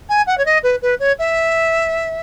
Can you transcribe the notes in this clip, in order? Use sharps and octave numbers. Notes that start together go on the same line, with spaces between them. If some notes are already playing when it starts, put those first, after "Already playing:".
G#5
F#5
C#5
D#5
B4
B4
C#5
E5